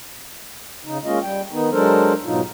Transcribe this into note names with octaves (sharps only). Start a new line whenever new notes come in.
C#3 D#4
G#3 A#3 C#4 F4 D#5
G3 G5
D#3 B3 D#4
F#3 G#3 D4 A4 A#4 C5
G#2 B2 F#3 D#4 F4